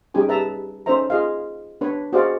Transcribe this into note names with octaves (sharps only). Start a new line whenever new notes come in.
G3 C#4 D#4 G4 G#4 G#5
B4 E5 A5 A#5
C#4 D#4 A4 C5 E5 A#5
F4 G#4 D#5 F5
D4 B4 C#5
F#4 G#4 C5 D5 D#5 F5